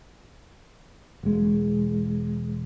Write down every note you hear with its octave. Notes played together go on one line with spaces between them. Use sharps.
E1 G#3